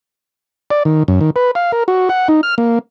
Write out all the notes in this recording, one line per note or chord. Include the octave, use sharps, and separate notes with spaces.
D5
D#3
F#2
D#3
B4
F5
A#4
F#4
F#5
D#4
F6
A#3